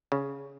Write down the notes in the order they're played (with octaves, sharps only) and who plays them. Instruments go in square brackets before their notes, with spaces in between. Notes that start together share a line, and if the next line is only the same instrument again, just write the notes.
[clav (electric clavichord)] C#3